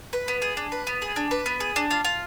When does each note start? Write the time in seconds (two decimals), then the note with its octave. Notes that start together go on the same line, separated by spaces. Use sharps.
0.13 B4
0.28 B3
0.42 G#4
0.57 D4
0.72 B4
0.87 B3
1.02 G#4
1.16 D4
1.31 B4
1.46 B3
1.60 G#4
1.76 D4
1.91 F4
2.05 F4